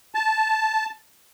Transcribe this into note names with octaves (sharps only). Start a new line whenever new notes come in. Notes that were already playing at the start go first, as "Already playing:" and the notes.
A5